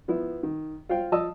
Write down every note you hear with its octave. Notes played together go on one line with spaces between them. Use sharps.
F3 B3 E4
D#3
F4 C5 F5 G5
F3 D#5 A5 D#6 E6